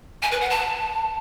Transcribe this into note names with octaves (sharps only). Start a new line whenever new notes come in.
G#5
B4
F#5
A5